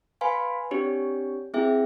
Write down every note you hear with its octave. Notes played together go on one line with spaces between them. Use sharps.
B4 F5 G#5 B5 C6
C4 D4 G4 C#5
C4 E4 G#4 E5 G5